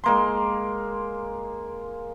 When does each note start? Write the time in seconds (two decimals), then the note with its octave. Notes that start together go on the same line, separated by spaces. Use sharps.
0.04 G#3 A#3 C6